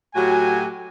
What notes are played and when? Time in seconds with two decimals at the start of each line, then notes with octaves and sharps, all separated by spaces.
0.15 A2 F#3 F#4 G4 G#5